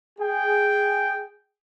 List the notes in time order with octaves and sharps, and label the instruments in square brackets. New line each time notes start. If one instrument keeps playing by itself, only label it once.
[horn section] G#4 G5